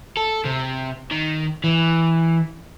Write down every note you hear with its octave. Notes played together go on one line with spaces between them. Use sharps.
A4
C3
D#3
E3